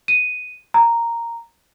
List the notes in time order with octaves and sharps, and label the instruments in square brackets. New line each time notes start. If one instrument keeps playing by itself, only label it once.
[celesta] D#7
A#5